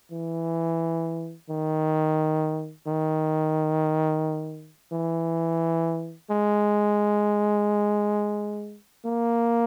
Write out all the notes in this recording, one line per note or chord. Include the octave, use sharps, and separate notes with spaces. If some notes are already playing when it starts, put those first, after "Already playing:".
E3
D#3
D#3
E3
G#3
A#3